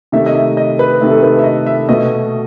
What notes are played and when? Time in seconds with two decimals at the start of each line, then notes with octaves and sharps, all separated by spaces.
0.12 C3 D#3 A3 E5
0.26 D#5
0.35 E5
0.57 D#5
0.79 B4
1.01 C3 D#3 A3
1.11 A4
1.23 B4
1.39 E5
1.44 D#5
1.67 E5
1.89 B2 A3 D#5